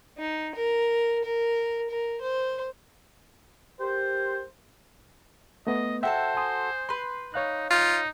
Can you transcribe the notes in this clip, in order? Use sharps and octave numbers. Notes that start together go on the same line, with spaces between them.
D#4
A#4
A#4
A#4
C5
G4 A#4 C5
A3 B3 D#5
F#4 A4 C5 E5 G5 A5
G#5 C6 D#6
B4 C6 G6
D#4 C#5 F5 F#6
D#4 F4